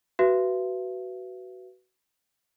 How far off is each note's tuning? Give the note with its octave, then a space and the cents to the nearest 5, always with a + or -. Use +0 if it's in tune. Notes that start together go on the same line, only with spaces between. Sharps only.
F#4 +20 B4 +0 E5 +35